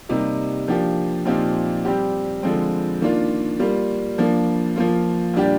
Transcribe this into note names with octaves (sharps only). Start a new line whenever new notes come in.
C3 G3 A#3 D#4
F3 A#3 D4 G4
A#2 F3 C4 D#4 G4
G3 C4 G4
D3 F3 G#3 C4
D#3 A#3 D4 F4
G3 A#3 F4
F3 A#3 D4
F3 A#3 F4
A#2 G3 D4 G4